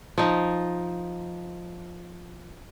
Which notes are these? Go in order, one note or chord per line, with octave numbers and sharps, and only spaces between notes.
F3 D#4